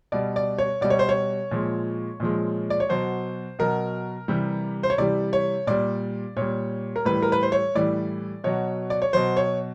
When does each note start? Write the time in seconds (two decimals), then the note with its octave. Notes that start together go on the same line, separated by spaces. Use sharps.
0.12 B2 G3 D5
0.36 D5
0.58 C#5
0.81 B2 G3 D5
0.90 C#5
0.99 C5
1.09 C#5
1.51 A#2 F3 G#3
2.20 A#2 F3 G#3
2.70 D5
2.80 C#5
2.89 B2 F#3 C5
3.59 B2 F#3 A#4
4.28 C3 E3 G3
4.83 C5
4.90 C#5
4.98 C3 E3 G3 D5
5.33 C#5
5.67 A#2 G3 D5
6.37 A#2 G3 C#5
6.96 A#4
7.05 A2 E3 G3 B4
7.22 A#4
7.32 B4
7.43 C5
7.52 C#5
7.75 A2 E3 G3 D5
8.44 B2 F#3 C#5
8.90 D5
9.02 C#5
9.13 B2 F#3 C5
9.37 C#5